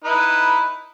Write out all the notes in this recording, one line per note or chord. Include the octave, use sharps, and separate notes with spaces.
D#4 E4 B4